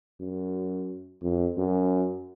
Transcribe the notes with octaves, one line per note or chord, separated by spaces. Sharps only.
F#2
F2
F#2